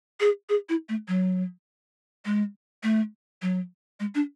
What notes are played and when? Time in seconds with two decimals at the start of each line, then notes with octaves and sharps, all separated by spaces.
0.20 G#4
0.49 G#4
0.69 E4
0.89 A3
1.08 F#3
2.25 G#3
2.83 A3
3.42 F#3
4.00 G#3
4.15 D4